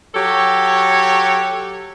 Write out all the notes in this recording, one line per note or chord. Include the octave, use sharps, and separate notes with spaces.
F#3 G4 A4 C#5